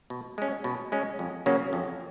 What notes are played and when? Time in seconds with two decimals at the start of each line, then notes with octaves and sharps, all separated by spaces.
0.10 B2
0.38 G#3 C#4
0.64 B2
0.92 G#3 C#4
1.19 F2
1.46 C#3 F#3 A#3 C#4
1.73 F2